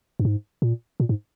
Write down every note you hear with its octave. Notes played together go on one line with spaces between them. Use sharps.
G2
G#2
A#2
A#2
G#2